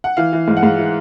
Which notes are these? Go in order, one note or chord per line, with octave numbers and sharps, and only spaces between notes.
F#5
E3 F5
E3
G#2
F#5
G#2 F5
E3